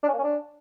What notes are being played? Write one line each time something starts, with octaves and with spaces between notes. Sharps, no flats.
D4
C#4
A#3
C#4
D4